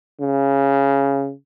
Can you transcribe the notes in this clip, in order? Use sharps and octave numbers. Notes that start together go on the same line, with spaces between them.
C#3